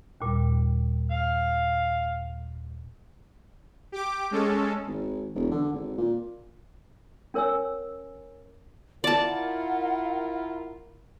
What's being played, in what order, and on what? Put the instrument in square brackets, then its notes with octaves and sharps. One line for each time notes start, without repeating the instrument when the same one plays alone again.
[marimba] D#2 A#2 G3
[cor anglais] F5
[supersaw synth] G4 D6
G#3 C#4 A4
[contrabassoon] G#1
E1
D3
G#1
A#2
[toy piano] C#4 A#4 C#5 G#5 E6
[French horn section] E4 F4 A#4 [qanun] D5 A5 [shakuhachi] F#5